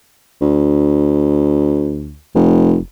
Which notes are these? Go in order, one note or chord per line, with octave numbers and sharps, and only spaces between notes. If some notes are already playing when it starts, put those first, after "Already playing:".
D2
F1